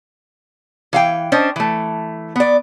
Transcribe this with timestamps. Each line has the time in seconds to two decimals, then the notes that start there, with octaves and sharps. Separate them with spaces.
0.93 E3 F5 G5
1.32 C#4 D4 C5 D#5
1.56 E3 A3
2.36 B3 D5